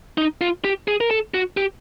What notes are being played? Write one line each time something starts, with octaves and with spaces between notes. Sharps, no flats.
D#4
F4
G4
G#4
A#4
A4
F#4
G4